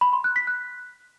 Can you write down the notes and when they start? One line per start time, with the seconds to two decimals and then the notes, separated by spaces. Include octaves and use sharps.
0.01 B5
0.13 C6
0.24 F#6
0.36 B6
0.47 F#6